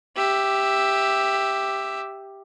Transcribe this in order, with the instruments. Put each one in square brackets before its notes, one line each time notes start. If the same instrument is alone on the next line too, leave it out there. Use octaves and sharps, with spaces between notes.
[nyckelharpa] G4 E5